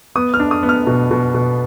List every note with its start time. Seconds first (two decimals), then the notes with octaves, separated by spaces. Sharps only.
0.15 B3 D#6
0.34 F6
0.40 D4
0.51 D#6
0.63 B3
0.69 F6
0.87 B2
1.11 B2
1.34 B2